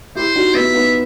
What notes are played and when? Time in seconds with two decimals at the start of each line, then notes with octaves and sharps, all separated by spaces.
0.15 E4 G4 C5
0.36 D#4 F#4
0.54 B3 D#4 E5
0.74 B3 D#4